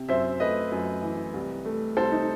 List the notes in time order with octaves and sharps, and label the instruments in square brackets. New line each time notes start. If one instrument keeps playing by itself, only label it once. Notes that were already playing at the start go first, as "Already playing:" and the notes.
Already playing: [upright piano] C3
F#2 C5 E5
A3 B4 D#5
F#2
E3
C2
A3
C2 A4 C5
D#4